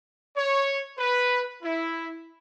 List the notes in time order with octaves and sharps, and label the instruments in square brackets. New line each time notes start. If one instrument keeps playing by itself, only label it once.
[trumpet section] C#5
B4
E4